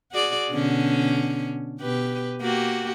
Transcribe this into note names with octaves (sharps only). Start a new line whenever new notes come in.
F#4 G#4 D5
B2 D3 C#4
B2 G4 B4
A#3 F#4 G4